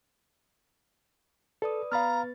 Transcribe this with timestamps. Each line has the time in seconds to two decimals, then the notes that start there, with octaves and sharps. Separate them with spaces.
1.62 A4 B4 D5 D#6
1.92 B3 B4 F5 A#5 B5 F6 A6